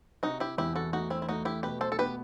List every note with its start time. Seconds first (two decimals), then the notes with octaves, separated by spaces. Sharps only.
0.23 C3 D#4 F#4
0.40 E4 G4
0.58 E2 E4 G4
0.76 F#4 A4
0.93 A3 D#4 F#4
1.10 C4 E4
1.22 E4
1.29 A3 D#4 F#4
1.45 E4 G4
1.63 B2 G4 B4
1.81 A4 C5
1.92 A4
1.99 B3 G4 B4